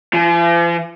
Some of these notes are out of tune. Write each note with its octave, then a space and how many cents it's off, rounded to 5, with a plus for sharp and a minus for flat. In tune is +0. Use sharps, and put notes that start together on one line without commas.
F3 -45